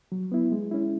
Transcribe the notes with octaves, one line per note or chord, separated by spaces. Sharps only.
F#3
B3 E4
G#3
C#4 E4